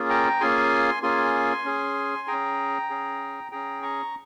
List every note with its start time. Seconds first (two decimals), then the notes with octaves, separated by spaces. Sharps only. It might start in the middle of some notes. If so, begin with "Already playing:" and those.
Already playing: A#3 C#4 F4 G#4
0.09 G5 A#5
0.41 A#3 C#4 F4 G#4 G#5 C6
1.03 A#3 C#4 F4 G#4 G#5 C6
1.65 C#4 G#4
2.28 C#4 G#4 G5 A#5
2.90 C#4 G#4
3.51 C#4 G#4 G5 A#5
3.83 A#5 C#6